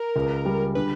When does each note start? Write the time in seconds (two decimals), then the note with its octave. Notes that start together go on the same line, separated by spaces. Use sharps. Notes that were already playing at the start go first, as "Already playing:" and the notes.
Already playing: A#4
0.16 C#2
0.45 G3
0.75 D3 B4